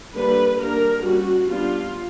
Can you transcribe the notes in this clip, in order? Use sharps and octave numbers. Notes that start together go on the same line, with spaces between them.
D3 G3 A#3 D4 B4
G3 A#3 D4 A#4
G3 A#3 C#4 F#4
G3 B3 D4 F4